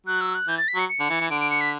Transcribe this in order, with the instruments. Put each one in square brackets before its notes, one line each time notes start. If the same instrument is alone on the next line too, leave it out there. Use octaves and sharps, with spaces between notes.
[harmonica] F#3 [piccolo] F#6
[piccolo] E6
F#6
[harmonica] E3 [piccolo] G6
[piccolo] A6
B6
[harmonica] F#3 [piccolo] C#7
[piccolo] C#7
[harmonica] D3
E3
E3
[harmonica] D3 [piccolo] D7
[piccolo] D7
C#7
B6